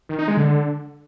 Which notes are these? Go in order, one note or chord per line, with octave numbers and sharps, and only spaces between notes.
D#3
D#4
G#3
D3